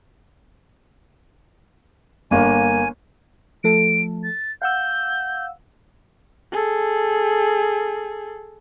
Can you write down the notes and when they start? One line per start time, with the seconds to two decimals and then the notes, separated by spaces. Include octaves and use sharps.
2.31 G1 A#3 G#5
3.64 F3 A3 A4 D7
4.24 A6
4.62 F5 F#5 E6 G6
6.52 G#4 A4